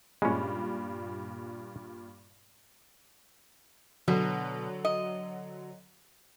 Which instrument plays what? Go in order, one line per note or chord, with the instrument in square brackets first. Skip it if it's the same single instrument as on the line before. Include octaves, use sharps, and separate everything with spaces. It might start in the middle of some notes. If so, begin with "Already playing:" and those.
[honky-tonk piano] G2 A#2 [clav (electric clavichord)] G#3 C#4
[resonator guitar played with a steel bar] B2 [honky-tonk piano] D3 F#3
[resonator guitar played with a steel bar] D#5